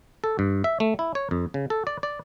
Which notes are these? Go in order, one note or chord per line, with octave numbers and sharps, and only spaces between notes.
A4
G2
E5
A3
E4
C#5
F2
C#3
A4
D5
D5